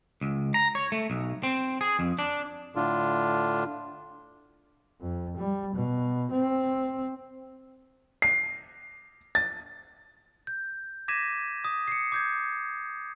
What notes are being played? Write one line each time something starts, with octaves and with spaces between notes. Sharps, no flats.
C#2
A#5
C#5
A3
B1
C4
G#4
F2
D4
A2 D3 D4 F4
F2
G3
B2
C4
C7
A6
G6
D6 G#6 A#6 B6 D#7 E7
D#6
C7 C#7
D6 G6 G#6